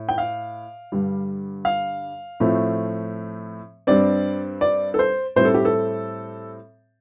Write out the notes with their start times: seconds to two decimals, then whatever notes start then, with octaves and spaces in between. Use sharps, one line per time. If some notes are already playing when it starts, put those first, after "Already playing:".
Already playing: A2
0.09 G5
0.18 F5
0.92 G2 D3 G3
1.65 F5
2.40 A2 F3 A3 C4
3.87 G2 G3 C4 D5
4.61 D5
4.94 A4
4.99 C5
5.36 A2 G3 C4 C5
5.45 A4
5.54 G4
5.65 A4